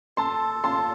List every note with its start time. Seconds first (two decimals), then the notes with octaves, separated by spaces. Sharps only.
0.17 A4 A5 C6
0.64 F4 A5 C6